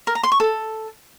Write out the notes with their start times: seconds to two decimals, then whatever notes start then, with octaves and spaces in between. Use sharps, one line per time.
0.07 A#4
0.15 A#5
0.23 C6
0.32 C#6
0.40 A4